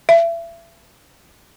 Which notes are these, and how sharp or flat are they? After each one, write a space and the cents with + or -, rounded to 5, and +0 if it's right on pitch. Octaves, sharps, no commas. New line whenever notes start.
E5 +35